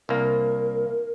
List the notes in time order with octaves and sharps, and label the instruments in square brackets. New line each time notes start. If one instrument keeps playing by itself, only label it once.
[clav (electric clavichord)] C2 A#3 [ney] A#4